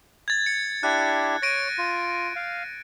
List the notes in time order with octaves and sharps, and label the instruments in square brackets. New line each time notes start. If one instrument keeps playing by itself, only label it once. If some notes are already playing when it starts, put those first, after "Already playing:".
[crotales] G#6 A6
C#7
[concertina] D4 E4 G4 [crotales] F#6
[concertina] C#5 [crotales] A#6 D7 D#7
[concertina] F4
F5